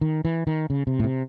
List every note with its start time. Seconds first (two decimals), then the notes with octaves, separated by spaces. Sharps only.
0.01 D#3
0.25 E3
0.47 D#3
0.70 C#3
0.87 C3
0.99 A2
1.04 C3